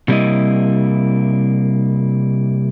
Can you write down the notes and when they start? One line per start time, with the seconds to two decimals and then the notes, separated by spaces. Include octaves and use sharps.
0.08 C3 G3 A#3 C#4 E4 D#5